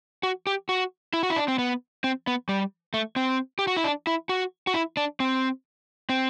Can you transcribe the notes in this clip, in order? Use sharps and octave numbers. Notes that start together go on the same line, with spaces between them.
F#4
G4
F#4
E4
F#4
E4
D4
C4
B3
C4
B3
G3
A3
C4
G4
F#4
E4
D4
E4
F#4
F#4
E4
D4
C4
C4